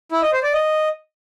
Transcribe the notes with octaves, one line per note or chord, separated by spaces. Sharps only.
E4
D#5
C5
D5
D#5